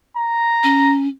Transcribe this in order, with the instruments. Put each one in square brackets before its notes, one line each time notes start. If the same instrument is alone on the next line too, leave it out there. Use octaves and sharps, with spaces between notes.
[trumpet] A#5
[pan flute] C#4